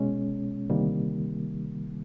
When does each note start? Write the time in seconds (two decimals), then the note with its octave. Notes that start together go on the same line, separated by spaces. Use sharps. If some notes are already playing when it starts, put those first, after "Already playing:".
Already playing: C2 B2 G#3 C#4
0.70 D2 C3 D#3 G3 A#3